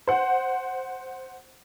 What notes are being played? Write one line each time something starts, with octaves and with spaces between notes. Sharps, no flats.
C5 F#5